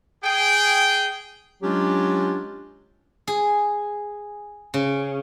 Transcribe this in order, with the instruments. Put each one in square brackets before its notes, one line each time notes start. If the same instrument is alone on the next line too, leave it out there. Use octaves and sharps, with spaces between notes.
[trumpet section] G#4 G5
[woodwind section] F#3 G#3 C#4 D4 F4 G4
[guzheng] G#4
C#3